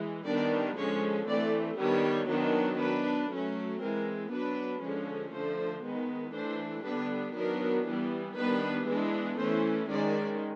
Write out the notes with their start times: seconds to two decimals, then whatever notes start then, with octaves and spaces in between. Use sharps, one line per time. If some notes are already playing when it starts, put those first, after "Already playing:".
Already playing: E3 G#3
0.25 D#3 G3 B3 D4 D5
0.77 D3 F3 G#3 C#4 C#5
1.28 E3 A3 C4 D5
1.78 D#3 G3 B3 D4 C#5
2.29 D#3 F#3 B3 D4
2.79 F#3 B3 D4 B4
3.31 F#3 A3 C#4
3.80 E3 G#3 C4 A#4
4.32 F#3 B3 D4 B4
4.82 D3 F3 G#3 C#4
5.33 D3 F3 A3 C5
5.84 D#3 G#3 B3
6.34 E3 A3 D4 C5
6.85 D3 G3 B3 D4 B4
7.35 D#3 F#3 B3 D4 A#4
7.86 E3 G3 B3
8.37 D#3 G3 B3 D4 B4
8.87 E3 G#3 B3 D4
9.38 E3 A3 C#4 C5
9.89 D#3 G#3 C#4 D5